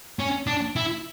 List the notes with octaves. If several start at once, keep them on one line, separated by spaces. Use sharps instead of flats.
C#4
D4
E4